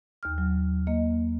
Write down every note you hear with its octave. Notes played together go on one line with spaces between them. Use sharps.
D#2 F6
F#3
A#3 D#5